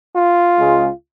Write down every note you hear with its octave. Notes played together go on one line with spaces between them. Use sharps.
F4
C#2 C#3 G#3